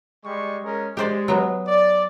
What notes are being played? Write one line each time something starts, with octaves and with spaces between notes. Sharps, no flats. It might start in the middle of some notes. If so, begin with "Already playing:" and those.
G3 G#3 C#6
G#3 C#4 A#4
G#3 G4 C5 D5
F#3 B3
D5